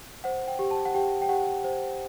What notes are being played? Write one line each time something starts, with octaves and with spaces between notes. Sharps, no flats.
C5 F#5
G5
G4
A5
F#5
G4 G5
G5
G4 F#5
C5